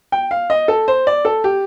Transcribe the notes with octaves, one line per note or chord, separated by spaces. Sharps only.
G5
F5
D#5
A4
C5
D5
A4
G4